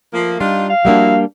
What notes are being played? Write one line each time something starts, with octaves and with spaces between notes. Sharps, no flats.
F3 A3 A#3
G3 D4 D#4 F4
F5
F3 G3 A#3 D4 E4 F#4